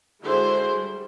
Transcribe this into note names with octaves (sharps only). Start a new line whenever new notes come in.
D3 G#3 E4 F#4 G#4 C5
G3